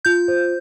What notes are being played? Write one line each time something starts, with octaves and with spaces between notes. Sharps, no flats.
F4 G6
C5